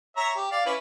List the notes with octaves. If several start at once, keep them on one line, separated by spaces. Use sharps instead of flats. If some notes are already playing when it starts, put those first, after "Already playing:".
C#5 E5 A#5
G4
D5 F5
C#4 E4 B4